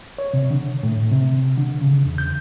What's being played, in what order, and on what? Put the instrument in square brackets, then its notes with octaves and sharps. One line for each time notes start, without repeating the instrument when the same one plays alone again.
[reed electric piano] C#5
C3
D3
A2
C3
D3
C#3
E2
G6